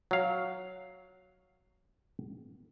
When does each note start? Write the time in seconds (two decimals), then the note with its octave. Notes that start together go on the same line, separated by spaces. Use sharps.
0.11 F#3 F5